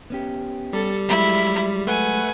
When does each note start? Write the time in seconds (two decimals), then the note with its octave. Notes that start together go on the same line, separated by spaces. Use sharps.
0.10 B3 C#4 G4
0.73 G3 A4
1.09 F#3 G#3 E4
1.87 A3 B4 F#5 G#5